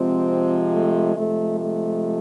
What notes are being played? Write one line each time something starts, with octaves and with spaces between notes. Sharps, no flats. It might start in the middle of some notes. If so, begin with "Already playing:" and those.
Already playing: C3 F3 G#3 C4
A3
C3 F3 G#3 A3
A3